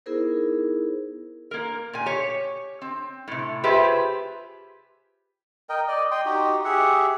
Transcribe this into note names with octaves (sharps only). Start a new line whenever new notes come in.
B3 D#4 E4 G#4 A#4 C5
A#3 A#4
A#2 G#5
G4 C#5
C4
A2 C3
F4 G4 G#4 B4 C5 E5
A#4 D#5 G5
D5 D#5
D#5 G5 C6
D#4 F#4 G4
G4 G#4 E5 F#5